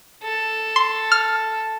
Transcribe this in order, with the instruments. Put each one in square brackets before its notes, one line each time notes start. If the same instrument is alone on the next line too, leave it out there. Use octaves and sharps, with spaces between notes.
[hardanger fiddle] A4
[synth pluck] C6
F6